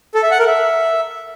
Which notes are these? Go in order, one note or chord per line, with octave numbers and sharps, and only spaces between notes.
A4
E5
F#5
A#4
E5